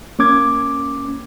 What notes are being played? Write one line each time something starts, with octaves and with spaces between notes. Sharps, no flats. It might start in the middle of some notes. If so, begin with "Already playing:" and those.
A#3 C#4 D6 G#6